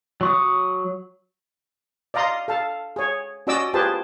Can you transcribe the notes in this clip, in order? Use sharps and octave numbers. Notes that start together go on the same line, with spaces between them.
F#3 C#6 D#6
D5 D#5 F5 A#5 C6
A4 F5 A5
G#4 C#5
C#4 F#4 D5 D#5 D6 E6
F4 G4 G#4 B4 C5 A5